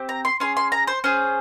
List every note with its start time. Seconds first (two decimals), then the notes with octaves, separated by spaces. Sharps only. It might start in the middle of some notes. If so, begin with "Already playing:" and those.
Already playing: C4 G4
0.09 A#5
0.25 C6
0.40 C#4 G#4 C6
0.57 C6
0.72 A#5
0.87 C5
1.04 C#4 G#4 C5